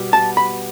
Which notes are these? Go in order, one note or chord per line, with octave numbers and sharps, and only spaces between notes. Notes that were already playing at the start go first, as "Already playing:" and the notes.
Already playing: B2 G3 B3
A5
B5